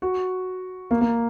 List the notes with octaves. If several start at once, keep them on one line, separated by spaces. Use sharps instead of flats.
F#4
A#3
A#3